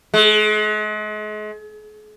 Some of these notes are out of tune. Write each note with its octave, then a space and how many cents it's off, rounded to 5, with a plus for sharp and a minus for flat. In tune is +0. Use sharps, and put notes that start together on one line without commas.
G#3 +40